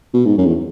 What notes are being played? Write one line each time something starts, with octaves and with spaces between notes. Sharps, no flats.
B2
G#2
F#2
E2